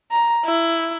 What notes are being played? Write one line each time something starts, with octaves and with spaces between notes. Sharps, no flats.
A#5
E4